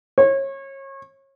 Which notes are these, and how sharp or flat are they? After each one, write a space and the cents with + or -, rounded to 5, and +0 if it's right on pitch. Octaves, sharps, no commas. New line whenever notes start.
C#5 -30